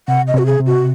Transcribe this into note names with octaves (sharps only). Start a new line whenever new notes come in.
C3 F#5
D#5
C3 F#4
G#4
C3
F#4